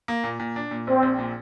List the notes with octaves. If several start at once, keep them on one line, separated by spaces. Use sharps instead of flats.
A#3
A#2
A#2
D4
A#2
A#1 C4
A#1
A#2